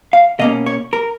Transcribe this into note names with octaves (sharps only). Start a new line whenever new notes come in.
F5
B2 A#3 C#4 D#5
C#5
A#4